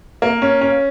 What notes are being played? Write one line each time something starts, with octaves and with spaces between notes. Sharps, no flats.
A#3
C#4
C#4